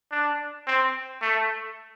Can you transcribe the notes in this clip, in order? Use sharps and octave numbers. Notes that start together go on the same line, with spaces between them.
D4
C4
A3